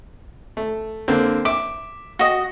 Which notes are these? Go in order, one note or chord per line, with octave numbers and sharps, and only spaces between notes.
A3
D3 A#3 C4
E5 D6
F#4 D#5